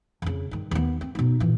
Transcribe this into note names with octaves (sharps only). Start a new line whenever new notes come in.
F2 C#3
G2 D#3
D#2 B3
C4
B2 D#4
A#2 E3